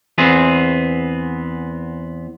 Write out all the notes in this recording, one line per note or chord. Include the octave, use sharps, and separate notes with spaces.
E2 B3 C4 G#4